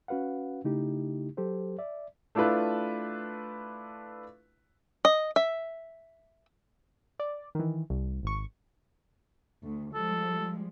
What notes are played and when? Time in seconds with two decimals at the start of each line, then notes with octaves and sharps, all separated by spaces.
0.08 C#4 F#4 B4 F5 F#5
0.64 C#3 A3 D#4 E4 G4
1.37 F#3 G4 A4 C5
1.79 D5 E5
2.35 A3 D4 E4 F4 B4
5.05 D#5
5.36 E5
7.20 D5
7.55 D#3 E3
7.90 C2
8.23 G#1 C#6
9.63 D2
9.94 F3 G3 G#3 A4